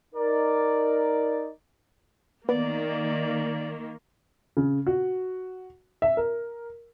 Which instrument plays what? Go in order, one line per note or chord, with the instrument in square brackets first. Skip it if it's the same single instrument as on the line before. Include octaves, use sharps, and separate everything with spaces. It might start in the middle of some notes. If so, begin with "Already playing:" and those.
[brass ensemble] D#4 A#4 D5
[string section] D#3 A#3 [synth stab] B3 [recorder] D5
[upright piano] C#3
F#4
E5
A#4